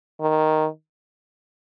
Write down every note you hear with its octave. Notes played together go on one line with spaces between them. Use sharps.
D#3